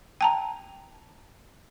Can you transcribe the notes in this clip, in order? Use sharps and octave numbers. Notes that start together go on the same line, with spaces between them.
G5 A5 A#5